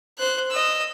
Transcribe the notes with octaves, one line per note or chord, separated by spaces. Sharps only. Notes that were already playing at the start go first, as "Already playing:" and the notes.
C5 F#6
D#5 E6